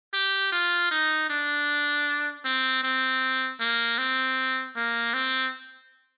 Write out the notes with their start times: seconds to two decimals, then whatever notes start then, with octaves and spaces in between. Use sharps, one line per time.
0.14 G4
0.52 F4
0.91 D#4
1.29 D4
2.45 C4
2.83 C4
3.60 A#3
3.98 C4
4.76 A#3
5.14 C4